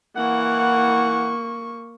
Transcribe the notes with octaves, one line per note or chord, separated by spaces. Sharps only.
E3 A#3 E4 F#5 C#6